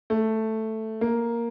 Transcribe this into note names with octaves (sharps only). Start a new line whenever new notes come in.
A3
A#3